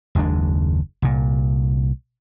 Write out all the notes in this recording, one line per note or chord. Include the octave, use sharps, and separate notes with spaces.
F#1 D#2 G#3 D4
C2 A#2